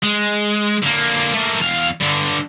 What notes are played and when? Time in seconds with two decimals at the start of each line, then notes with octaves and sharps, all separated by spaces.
0.03 G#3
0.83 D3 A#3
1.34 A3 A#3
1.60 E2 F5
2.00 G2 D3